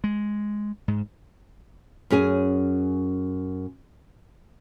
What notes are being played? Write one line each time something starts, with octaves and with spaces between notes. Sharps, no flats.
G#3
G#2
F#2 C#4 G#4 G#5